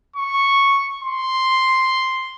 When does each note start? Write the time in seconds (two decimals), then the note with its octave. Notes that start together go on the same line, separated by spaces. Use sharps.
0.16 C#6
1.03 C6